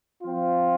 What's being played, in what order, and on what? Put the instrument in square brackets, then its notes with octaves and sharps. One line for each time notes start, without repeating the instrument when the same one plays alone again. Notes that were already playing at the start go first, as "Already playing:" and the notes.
[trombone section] F3 C4 F4